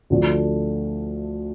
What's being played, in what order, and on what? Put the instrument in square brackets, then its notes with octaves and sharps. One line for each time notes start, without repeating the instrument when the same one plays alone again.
[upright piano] D2 D3 F3 A3 D4